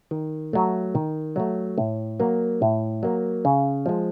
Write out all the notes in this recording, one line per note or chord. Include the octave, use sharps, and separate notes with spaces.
D#3
F#3 A3
D#3
F#3 A3
A2
F#3 A#3
A2
F#3 A#3
C#3
F3 G#3